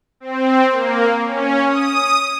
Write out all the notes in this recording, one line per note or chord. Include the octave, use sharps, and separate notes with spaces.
C4
A#3
C#4
D#6